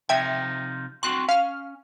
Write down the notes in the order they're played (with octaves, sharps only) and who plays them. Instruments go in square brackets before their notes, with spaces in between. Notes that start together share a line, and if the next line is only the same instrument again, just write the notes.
[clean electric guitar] C3 F3 D#4 [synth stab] E5 G5 G#6
[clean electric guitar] C4 F#4 C6 [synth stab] F#6
[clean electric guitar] C#4 [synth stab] F5 F6